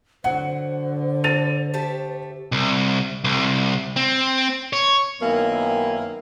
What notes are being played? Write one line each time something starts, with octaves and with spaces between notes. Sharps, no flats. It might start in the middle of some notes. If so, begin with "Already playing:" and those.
D3 F#3 C5 F#5
A4 A6 D#7 F7
A3 G4 A5
C2
C2
C4
C#5
F#2 D#3 A#3 B3 E4 G#5